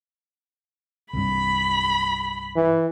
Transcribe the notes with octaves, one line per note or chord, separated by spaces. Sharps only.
C2 G2 B5
E3